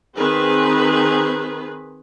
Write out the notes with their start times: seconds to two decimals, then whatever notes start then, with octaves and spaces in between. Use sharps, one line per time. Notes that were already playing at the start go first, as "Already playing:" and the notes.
0.16 D#3 C4 G#4 B4